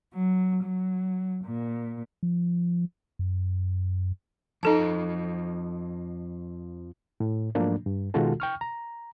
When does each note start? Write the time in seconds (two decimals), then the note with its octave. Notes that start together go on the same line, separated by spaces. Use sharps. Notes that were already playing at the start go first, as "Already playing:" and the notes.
0.13 F#3
0.64 F#3
1.44 A#2
2.23 F3
3.19 F#2
4.63 F2 F3 D#4 A4 D#5 A5
7.20 A2
7.55 G#2 F3 F#3 A3 A#3 D4
7.86 G2
8.14 B2 D#3 G#3 F4 F#4 A4
8.40 G5 C#6 F6
8.61 A#5